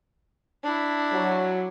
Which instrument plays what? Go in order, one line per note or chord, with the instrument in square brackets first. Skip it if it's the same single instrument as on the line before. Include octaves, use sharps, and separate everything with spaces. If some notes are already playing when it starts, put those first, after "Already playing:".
[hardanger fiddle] D4 E4
[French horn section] F#3